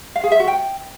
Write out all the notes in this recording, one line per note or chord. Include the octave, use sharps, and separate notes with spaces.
F5
G#4
E5
F#4
G5